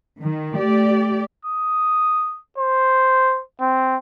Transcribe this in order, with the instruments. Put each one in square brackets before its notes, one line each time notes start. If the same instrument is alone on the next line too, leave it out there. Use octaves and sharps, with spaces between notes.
[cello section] D#3
A3 G4 D5
[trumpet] D#6
C5
C4